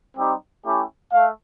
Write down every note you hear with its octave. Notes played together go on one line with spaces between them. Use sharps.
G3 C4 D#4 G4
A3 C#4 E4 G4
A3 F5